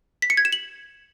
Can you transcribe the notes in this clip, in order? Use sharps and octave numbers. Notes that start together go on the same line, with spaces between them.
B6
C#7
G#6
E7
F#7